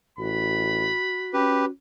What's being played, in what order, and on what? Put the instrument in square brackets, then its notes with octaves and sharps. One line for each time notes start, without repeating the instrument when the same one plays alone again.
[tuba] A1 [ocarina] F#4 [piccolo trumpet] B5
[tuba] C#4 [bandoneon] G4 B4